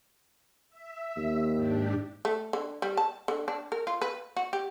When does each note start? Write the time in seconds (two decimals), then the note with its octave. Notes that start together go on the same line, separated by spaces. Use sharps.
0.70 E5
1.16 D#2
1.55 G#2 D4 G4
2.25 A3
2.53 D3
2.82 G3
2.97 A5
3.28 D3
3.48 D4
3.72 A#4
3.87 F4
4.02 B4
4.36 F#4
4.53 G4